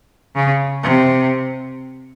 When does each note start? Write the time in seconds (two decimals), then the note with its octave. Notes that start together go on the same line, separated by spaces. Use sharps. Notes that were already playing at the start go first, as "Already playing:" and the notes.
0.36 C#3
0.83 C3